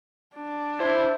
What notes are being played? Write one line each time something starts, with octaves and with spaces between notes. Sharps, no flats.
D4
E4 C5